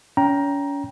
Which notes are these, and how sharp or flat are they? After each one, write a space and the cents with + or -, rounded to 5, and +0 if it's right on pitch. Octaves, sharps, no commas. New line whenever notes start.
C#4 +35 G5 +0 A#5 +15